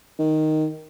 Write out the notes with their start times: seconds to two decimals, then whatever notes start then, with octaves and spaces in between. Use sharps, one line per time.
0.19 D#3